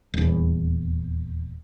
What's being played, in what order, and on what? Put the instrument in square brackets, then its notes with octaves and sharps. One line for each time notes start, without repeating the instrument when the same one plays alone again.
[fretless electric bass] D#1 E2